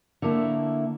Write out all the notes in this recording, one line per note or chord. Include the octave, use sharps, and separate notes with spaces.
D3 A3 A#3 E4